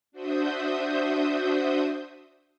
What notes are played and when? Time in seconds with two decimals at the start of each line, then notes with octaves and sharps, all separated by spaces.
0.12 D4 F#4 C5 E5 D#6 G6